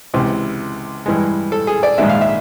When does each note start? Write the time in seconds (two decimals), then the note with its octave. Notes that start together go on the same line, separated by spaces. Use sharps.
0.14 C#2 C3 E3
1.06 G2 E3 G#3
1.52 A4
1.67 G#4
1.83 D5
1.98 A#1 G#2 D#3 G#3 E5
2.09 F5
2.21 E5